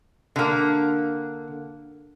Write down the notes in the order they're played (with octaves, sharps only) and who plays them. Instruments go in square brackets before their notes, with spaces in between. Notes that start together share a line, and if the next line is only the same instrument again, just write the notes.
[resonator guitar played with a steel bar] D3 A#3